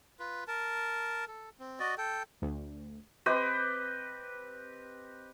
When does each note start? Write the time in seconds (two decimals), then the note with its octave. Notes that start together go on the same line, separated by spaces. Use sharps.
0.19 F4 B4
0.48 A#4 A5
1.28 A4
1.59 C4
1.80 F#4 D5 D#5
1.98 A4 G5
2.42 D2
3.26 C4 G4 B4 D#5